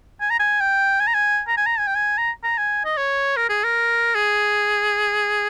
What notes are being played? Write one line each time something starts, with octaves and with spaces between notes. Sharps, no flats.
G#5
A#5
G#5
G5
G#5
A#5
G#5
A#5
G#5
A#5
G#5
G5
G#5
A#5
A#5
G#5
D#5
C#5
A#4
G#4
A#4
G#4